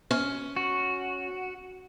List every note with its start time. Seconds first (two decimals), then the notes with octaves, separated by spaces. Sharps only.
0.11 C#4
0.56 F#4